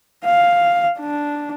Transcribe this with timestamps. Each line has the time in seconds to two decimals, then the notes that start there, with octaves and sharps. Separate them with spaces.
0.24 F5
0.99 D4